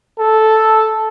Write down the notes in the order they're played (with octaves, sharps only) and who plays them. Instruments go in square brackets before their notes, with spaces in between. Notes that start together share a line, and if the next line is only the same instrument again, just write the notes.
[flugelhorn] A4